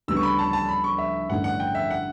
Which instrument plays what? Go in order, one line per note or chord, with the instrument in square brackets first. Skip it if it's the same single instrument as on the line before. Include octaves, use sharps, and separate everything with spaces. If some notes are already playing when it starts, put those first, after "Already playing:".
[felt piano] D2 C#3 G3 B3 [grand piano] E6
[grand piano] C#6
B5
A5
A5
B5
C#6
E5
[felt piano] A1 G2 D3 A3 C#4 [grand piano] F#5
[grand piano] F#5
G5
E5
F#5